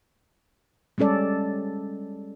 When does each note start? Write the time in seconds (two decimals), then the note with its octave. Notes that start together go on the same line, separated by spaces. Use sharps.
0.98 G3 G#3 C#4 A4 D5